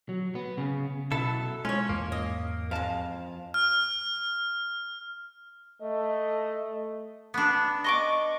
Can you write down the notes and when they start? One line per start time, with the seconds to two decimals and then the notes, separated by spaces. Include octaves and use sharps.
0.09 F#3
0.35 B3
0.58 C#3
1.12 B2 F#3 E4 A4
1.65 G#3 C#4 F4 C#5
1.89 E2 G#2 A#3
2.12 D#5
2.71 F2 G#3 F5 A5
3.54 F6
5.82 A3 D#5
7.34 B3 D4
7.84 D#5 C#6 D6